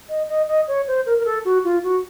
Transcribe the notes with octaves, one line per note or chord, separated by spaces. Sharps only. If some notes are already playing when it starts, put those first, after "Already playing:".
D#5
D#5
D#5
C#5
C5
A#4
A#4
A4
F#4
F4
F#4